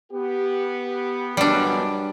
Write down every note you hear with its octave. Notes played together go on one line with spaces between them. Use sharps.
B3 G4
C#2 F#2 G3 B3 D4